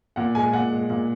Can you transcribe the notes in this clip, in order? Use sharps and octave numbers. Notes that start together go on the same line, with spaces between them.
A#2 F#5
G#3 G#5
A#2 F#5
G#3
A#2